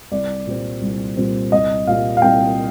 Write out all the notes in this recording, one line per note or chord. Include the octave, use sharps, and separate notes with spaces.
C2 D5
A#2 G3 C4
C2
A#2 G3 C4
C2 D#5
A#2 G3 F5
F5
C2 G5